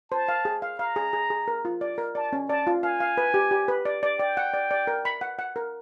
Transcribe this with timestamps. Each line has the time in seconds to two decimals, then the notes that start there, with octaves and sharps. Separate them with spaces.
0.11 C5 A5
0.28 F5
0.45 G#4
0.62 F5
0.79 F5 A#5
0.96 G#4
1.13 G#4
1.30 G#4
1.48 A#4
1.65 F4
1.81 D5
1.98 A#4
2.15 D5 A5
2.33 C#4
2.49 D5 A5
2.67 F4
2.83 F5 G#5
3.00 F5
3.17 B4
3.34 G4
3.51 G4
3.68 B4
3.85 D5
4.03 D5
4.19 D5 G5
4.37 F#5
4.54 D5
4.71 D5
4.87 A#4
5.05 B5
5.21 F#5
5.39 F#5
5.56 A#4